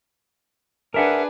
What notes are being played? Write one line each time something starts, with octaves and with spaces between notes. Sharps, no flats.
D4 G#4 A#4 B4 E5 F#5